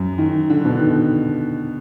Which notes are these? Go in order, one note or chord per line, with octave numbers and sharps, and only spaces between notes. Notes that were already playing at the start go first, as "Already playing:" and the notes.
Already playing: F#2
D#3
D3
B2
D#3